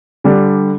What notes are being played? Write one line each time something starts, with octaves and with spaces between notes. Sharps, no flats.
D3 G3 D4